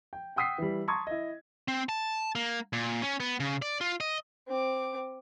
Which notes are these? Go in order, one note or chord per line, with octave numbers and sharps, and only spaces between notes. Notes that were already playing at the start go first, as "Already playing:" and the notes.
G5
F#5 G5 D#6 E6 B6 C7
E3 G3
A5 A#5 C6 C#6 D#6 G#6
E4 D#5
C4
A5
A#3
A#2
C#4
B3
C#3
D5
F4
D#5
C4 D6